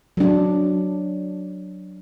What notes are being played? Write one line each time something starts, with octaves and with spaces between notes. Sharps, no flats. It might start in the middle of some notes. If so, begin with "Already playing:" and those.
F#3 D4